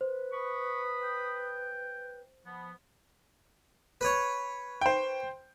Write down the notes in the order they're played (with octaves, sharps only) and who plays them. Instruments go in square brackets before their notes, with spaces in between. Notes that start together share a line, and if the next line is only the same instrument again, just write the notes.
[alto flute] B4 [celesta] C5
[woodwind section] B5 D#6 [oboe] C#6
[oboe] G5
[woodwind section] F3 B3
[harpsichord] B4 C#5
[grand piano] C5 G5